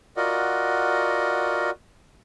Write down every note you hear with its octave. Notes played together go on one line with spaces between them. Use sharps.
F4 F#4 A#4 D5 D#5 F#5